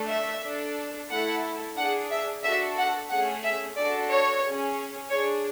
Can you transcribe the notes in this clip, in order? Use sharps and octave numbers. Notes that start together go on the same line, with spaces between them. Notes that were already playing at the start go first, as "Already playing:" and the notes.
Already playing: A3 D4 A4
E5
D4 A4
A3 E4 A4 F#5
D4 G#4 F#5
E5
D4 F#4 A4 E5
F#5
A3 C#4 G#4 F#5
E5
D4 F#4 A4 D5
C#5
C#4 G#4
D4 G#4 C#5